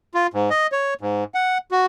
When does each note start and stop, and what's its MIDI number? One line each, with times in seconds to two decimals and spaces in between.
0.14 0.27 65
0.34 0.50 44
0.50 0.67 75
0.72 0.94 73
1.01 1.24 44
1.34 1.58 78
1.71 1.86 66